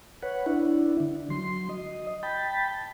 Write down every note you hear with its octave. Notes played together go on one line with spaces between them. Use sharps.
B4 C#5 F#5
D4 E4
D3
F#3 C6
D#5
G5 A5 B5